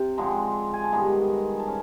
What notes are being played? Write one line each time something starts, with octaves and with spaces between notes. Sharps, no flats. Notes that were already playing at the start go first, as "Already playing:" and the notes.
Already playing: C3
D3 F3 G#3 C4 A#5
G#5
A5
G2 D#3 G#3 B3 A#5
A5
C#4